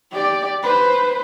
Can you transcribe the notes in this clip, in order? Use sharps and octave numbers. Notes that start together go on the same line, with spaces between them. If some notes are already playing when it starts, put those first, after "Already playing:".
G4 D5
B4 C5